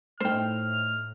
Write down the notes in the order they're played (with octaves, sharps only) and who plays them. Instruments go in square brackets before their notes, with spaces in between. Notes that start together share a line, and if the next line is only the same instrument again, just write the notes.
[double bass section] A2 [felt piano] A3 D#4 [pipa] C5 G5 [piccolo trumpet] F6